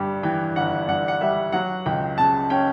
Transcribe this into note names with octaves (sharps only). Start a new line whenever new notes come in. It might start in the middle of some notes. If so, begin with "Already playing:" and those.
Already playing: G1 G2 G3
E3 G5
G1 F#5
G2 F#5
F#5
G3 E5
F#3 F#5
C#2 G5
C#3 A5
C#4 G5